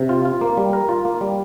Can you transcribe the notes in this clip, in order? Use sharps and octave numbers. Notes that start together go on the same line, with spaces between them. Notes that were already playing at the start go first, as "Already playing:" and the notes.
Already playing: C3
F4
F4
A#3
G3
A#4
F4
A#3
G3